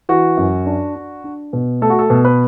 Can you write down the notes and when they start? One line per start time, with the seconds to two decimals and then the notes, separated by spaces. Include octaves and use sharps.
0.09 E3 F#4
0.37 F#2
0.66 D4
0.96 D4
1.24 D4
1.53 B2
1.82 A3 A4
1.90 F#4
1.99 A4
2.10 B2
2.25 B4